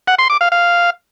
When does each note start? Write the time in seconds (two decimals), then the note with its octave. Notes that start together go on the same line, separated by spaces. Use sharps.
0.07 F#5
0.19 C6
0.30 D6
0.41 F5
0.52 F5